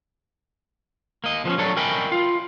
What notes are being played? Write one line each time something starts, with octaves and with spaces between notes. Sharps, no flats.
A#3 D#5
F3 B3 C#4
F#3 D4 A4 C#5
A#4 D#5 E5 G5 G#5 B5
F4